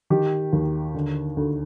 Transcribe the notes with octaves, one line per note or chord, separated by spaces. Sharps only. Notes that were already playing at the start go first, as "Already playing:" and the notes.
D#3 G4
D#2
D3
D2